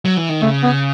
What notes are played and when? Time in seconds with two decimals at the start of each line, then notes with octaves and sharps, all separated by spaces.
0.05 F#3
0.17 E3
0.29 D#3
0.42 C#3 A3
0.63 B3